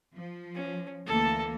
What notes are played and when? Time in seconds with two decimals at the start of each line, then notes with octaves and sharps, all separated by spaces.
0.14 F3
0.54 C#4
1.06 D2 E3 A#3 A4 A5